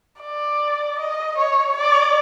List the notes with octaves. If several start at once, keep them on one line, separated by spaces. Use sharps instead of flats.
D5
D#5
C#5
D5